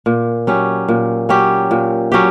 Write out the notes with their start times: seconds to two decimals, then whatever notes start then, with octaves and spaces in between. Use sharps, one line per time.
0.06 A#2
0.47 F#3 C#4 G4
0.88 A#2
1.29 F#3 C#4 G4
1.71 A#2
2.12 F#3 C#4 G4